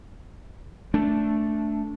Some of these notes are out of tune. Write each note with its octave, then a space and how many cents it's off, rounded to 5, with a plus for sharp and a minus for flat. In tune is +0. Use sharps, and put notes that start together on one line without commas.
A3 +0 D4 -15